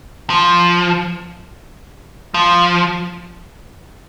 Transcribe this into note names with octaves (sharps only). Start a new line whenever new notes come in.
F3
F3